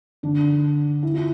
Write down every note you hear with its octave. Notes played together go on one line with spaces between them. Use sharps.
D3 D4
E4
F4